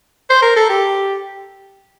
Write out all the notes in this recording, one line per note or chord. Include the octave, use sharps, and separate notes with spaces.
C5
A#4
A4
G4